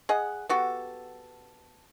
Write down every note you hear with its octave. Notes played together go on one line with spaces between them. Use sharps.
G#4 D#5 F#5
B3 F#4 G4 A4